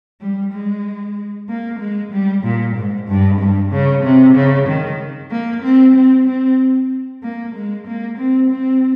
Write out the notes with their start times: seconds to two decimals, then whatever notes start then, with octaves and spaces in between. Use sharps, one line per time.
0.21 G3
0.53 G#3
1.49 A#3
1.80 G#3
2.12 G3
2.44 A#2
2.76 G#2
3.08 G2
3.40 G2
3.72 C#3
4.04 C3
4.35 C#3
4.68 D#3
5.31 A#3
5.63 C4
5.95 C4
6.27 C4
7.23 A#3
7.55 G#3
7.87 A#3
8.18 C4
8.51 C4